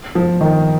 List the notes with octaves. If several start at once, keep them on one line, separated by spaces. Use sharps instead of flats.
F3
D#3